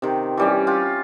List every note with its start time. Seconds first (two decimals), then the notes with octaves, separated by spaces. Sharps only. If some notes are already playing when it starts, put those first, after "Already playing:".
0.02 C3 D#3
0.37 E3 G3 C#4
0.67 F4 G4